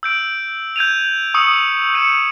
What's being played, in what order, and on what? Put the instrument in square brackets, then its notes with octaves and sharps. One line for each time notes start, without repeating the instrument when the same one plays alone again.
[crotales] E6 G6 D7
G6 G#6 D#7 F7
C#6 D#6 E6 C#7 D#7 F7
G6 C#7 D#7 E7